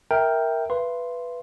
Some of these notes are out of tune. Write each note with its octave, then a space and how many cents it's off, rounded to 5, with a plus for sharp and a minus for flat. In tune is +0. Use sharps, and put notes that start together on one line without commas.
A#4 +0 E5 -15 G5 +0
B4 +0 E5 +45 C6 +0